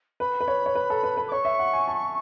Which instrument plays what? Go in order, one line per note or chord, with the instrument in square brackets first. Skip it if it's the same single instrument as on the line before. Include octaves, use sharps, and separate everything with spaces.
[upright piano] B4 [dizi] B5
[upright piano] B4
C#5
C#5
B4
A4
B4
B4
[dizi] D6
[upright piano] C#5 [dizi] C#6
[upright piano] E5
F#5
G#5
A5